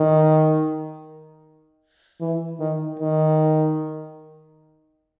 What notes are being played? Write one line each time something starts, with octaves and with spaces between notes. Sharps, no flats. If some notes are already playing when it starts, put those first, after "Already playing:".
Already playing: D#3
E3
D#3
D#3